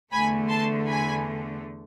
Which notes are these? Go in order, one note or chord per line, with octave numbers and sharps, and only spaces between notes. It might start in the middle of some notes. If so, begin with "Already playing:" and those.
E2 D3 A3 G#5 B5
A5 C6
G#5 B5